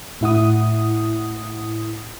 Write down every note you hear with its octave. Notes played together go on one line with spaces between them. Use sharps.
A2 E4 F#5 D#6